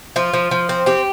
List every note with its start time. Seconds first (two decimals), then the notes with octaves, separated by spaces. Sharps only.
0.16 F3 F4
0.33 F3
0.51 F3
0.69 C4
0.86 C4 G4